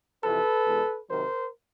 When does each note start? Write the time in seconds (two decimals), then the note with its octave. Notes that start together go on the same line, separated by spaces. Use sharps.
0.24 F2 C3 E3 A4 B4
0.66 E2 B2 G#3
1.09 C3 D#3 F#3 A#4 C5